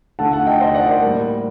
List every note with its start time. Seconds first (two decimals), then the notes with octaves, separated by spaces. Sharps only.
0.19 D3 A3 F#5 A5
0.33 F#5 A5
0.47 D#5 G5
0.61 C5 D#5
0.75 D5 F#5
0.88 A#4 D5
1.03 A2 G3 A#3